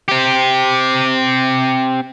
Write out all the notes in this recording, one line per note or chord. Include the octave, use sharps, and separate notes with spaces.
C4 G4